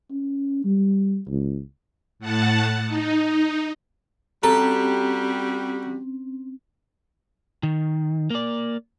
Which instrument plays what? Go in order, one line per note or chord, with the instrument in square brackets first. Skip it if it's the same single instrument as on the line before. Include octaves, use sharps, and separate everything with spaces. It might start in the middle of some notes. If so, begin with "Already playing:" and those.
[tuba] C#4
G3
C#2
[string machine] A2 F#5 A5
D#4
[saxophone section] G3 F#4 G4 [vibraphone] C4 C#4 [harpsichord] A4 [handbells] A#5
[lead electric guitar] D#3
A#3 D5